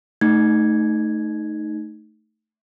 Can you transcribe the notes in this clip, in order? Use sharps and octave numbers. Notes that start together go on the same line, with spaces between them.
A3 D#4 G#6